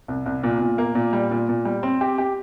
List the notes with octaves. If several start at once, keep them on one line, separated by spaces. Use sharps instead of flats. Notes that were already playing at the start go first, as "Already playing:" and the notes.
C2
C2
A#2
A#2
A#3
A#2
G3
A#2
A#2
G3
C4
G4
G4